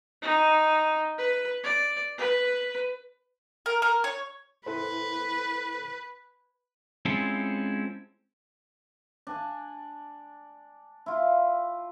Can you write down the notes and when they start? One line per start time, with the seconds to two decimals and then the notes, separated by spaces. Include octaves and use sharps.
0.22 D#4
1.18 B4
1.64 D5
2.18 B4
3.66 A#4
3.82 A#4
4.04 C#5
4.66 E4 A4 B4 C5
7.05 G#3 C4 C#4 E4 F4 A4
9.27 D4 G#5 A5
11.06 E4 F4